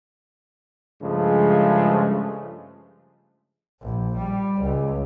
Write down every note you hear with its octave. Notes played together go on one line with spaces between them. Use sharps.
G2 C#3 F3 G#3 A3
A#1
G3
C#2